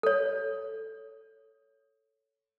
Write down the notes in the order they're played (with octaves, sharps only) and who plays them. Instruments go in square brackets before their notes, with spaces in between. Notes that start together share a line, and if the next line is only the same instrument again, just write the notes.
[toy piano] A4 C#5